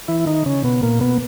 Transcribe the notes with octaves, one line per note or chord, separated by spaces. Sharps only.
E3 E4
D#3 D#4
C#3 C#4
B2 B3
A#2 A#3
B2 B3